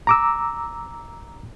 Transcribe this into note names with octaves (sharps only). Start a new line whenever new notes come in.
A#5 D6 E6